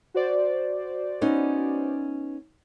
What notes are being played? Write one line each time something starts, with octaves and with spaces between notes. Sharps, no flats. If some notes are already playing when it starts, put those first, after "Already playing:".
F#4 C5 D5
B3 C#4 D#4